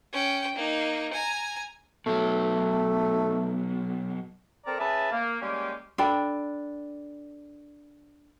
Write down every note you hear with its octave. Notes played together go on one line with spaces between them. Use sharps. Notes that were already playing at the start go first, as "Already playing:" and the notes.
C#4 G5
A#3 D#4
G#5 A#5
B2 F#3 A3
C4 A4 A#4 D5 A5 A#5
C#4 G#4 B4 E5 A5
A#3
G3 G#3 A#3 C#4 G4
D4 A4 G5 B5